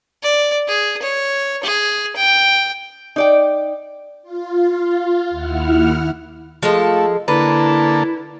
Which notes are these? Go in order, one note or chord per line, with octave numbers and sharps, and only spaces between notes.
D5
G#4
C#5
G#4
G5
D#4 D5 G5
F4
D#2 E4 F#5 F6
F3 G#3 A3 A4
D3 A#3 E4 A4 B4